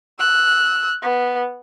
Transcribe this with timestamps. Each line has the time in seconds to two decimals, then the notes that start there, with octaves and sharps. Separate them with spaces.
0.19 E6 F#6
1.02 B3